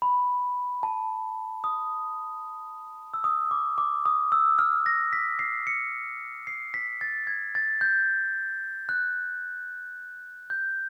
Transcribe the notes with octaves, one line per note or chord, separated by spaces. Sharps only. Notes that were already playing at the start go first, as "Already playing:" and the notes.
B5
A5
D#6
E6
D#6
D6
D6
D#6
E6
F6
A#6
B6
C7
C#7
C7
B6
A6
G#6
A6
G6
F#6
G6